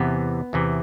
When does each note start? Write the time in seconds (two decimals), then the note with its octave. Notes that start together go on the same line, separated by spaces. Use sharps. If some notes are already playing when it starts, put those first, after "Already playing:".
Already playing: E2 C3 E3 B3
0.53 E2 C3 E3